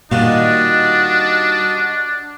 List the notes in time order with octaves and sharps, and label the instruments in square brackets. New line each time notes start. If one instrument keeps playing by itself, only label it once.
[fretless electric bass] A#2 [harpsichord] D#3 G3 F4 [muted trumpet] D4 [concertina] F#4 D#5